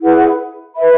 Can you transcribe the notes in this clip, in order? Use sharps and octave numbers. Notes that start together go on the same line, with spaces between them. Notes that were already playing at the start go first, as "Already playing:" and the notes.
E4 G#4 B4 F#5
B4 E5 B5